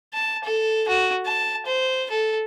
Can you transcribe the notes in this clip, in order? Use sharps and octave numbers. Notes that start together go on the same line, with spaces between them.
A5
A4
F#4
A5
C5
A4